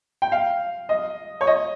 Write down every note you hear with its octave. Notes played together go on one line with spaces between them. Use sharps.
G5
F5
D#5
C#5
D#5